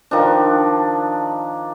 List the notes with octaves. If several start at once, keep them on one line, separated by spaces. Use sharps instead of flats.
D#3 F3 D4